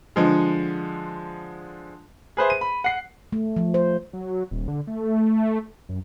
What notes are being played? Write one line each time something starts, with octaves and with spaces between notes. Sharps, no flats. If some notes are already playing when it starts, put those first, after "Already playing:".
D3 F3 G#3
G#4 B4 C5 E5
D#7
B5
F#5 C7
A3
F3
C5
F#3
D#1
D3
A3
F#2